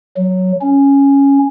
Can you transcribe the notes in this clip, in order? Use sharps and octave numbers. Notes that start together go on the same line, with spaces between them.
F#3
C#4